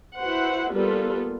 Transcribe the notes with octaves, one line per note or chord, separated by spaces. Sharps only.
E4 F#4 B4 C5 F#5
G3 A#3 B3 F4 A4 B4